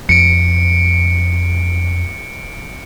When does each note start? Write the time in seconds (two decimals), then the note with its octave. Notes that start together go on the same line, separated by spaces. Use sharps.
0.09 F2 C#7 D7